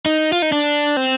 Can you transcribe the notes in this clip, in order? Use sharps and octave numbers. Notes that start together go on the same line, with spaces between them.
D#4
F4
D#4
D4
C4